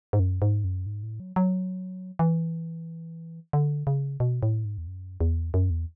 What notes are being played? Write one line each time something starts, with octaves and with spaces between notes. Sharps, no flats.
G#2
F#2
G#2
F#2
G#2
A2
F#3
F#3
E3
D3
C#3
B2
A2
G#2
E2
F#2
E2
F#2
E2